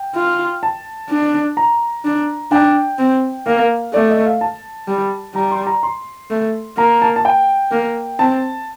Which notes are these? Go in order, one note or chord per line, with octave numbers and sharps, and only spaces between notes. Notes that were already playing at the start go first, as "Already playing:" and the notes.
Already playing: G5
F4
A5
D4
A#5
D4
D4 G5
C4
A#3 F5
A3 D5
D#5
F5
A5
G3
G3 A#5
C6
A#5
C6
A3
A#3 A#5
A5
A5
G5
A#3
C4 A5